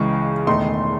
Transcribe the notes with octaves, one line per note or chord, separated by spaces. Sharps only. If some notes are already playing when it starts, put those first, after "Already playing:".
Already playing: C#2 C#3 E3 G#3 C#6
E1 E2 D#3 A3 D#4 C6